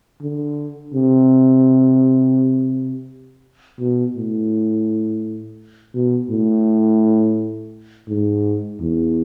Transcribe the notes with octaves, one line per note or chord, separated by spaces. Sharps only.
D3
C3
B2
A2
B2
A2
G#2
E2